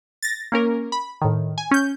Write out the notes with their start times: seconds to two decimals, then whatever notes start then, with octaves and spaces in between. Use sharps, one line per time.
0.23 A6 A#6
0.52 A#3 C#4 A#4
0.92 B5
1.22 A2 D#3
1.58 G#5
1.71 C#4 G6